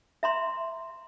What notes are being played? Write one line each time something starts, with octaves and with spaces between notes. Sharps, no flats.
E5 A#5 C6